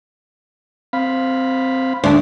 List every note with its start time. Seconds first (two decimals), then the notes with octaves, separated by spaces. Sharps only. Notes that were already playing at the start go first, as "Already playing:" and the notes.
0.93 C4 F5 B5
2.04 D2 D4